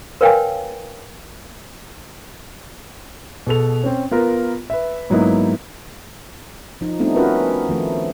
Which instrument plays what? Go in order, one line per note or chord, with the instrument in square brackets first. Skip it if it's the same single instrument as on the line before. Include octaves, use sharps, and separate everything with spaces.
[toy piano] A#4 B4 C#5 F5 G5 G#5
[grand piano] B2 G#4 A4 F7
C4 C#4
B3 F4 A#4
B4 E5
G#2 F#3 A#3 B3 D#4 E4
[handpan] F3 D#4
G3 A3 B3 C4 D4 D#4
C#4 F4 F#4 A#4 B4
D#3 F3 A3